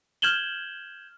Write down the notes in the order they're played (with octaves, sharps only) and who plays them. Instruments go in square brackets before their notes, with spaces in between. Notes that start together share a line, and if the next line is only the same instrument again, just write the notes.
[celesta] F6 G6 G#6 E7 F#7 G7